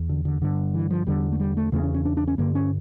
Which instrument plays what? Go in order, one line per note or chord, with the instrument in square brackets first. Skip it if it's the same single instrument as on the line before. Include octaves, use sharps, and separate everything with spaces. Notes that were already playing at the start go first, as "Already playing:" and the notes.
Already playing: [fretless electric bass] E2
D3
D3
G2 D3
E3
F3
E2 D3 G3
A3
G3
A3
E2 C#3 A3
C#4
C#4
D4
D4
C#4
G2 D3 A#3
C#4